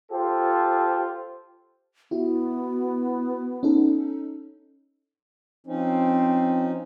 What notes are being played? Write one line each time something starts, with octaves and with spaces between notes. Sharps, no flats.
F4 G4 A4 C5
B3 E4 F#4
C#4 D#4 A4
F3 C4 C#4 D#4